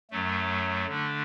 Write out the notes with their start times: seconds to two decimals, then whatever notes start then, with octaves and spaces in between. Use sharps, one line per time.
0.11 F#2 F#3 A3
0.87 D3 A3 D4